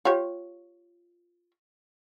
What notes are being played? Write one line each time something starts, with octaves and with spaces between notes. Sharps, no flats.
F4 G4 C#5